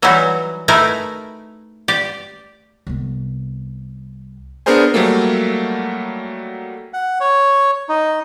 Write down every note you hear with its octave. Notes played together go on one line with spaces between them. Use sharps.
E3 F#3 G3 D#4 E4 F#4
A3 D#4 E4 A#4 B4 G#5
G4 D5
C2 B3
B3 D4 G#4 A#4 C5 G#5
F#3 G3 A3 A#3
F#5
C#5
D#4